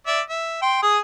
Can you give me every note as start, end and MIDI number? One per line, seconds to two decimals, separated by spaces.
0.07 0.21 74
0.07 0.21 76
0.30 0.61 76
0.62 0.80 79
0.62 0.80 84
0.83 0.99 68
0.83 0.99 87